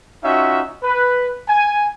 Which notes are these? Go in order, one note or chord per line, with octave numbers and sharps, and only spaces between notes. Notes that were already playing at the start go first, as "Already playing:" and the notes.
C#4 D#4 F4 F#4 E5
B4
G#5